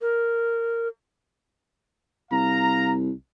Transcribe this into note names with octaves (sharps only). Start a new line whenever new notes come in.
A#4
C2 F5 A#5